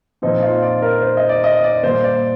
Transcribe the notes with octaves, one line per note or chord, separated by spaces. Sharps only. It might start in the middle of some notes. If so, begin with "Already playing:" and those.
A#2 F3 C4 D#4
F4
D5
A#4
C5
D#5
D5
D#5
D5
A#2 G3 A#3 C5
D5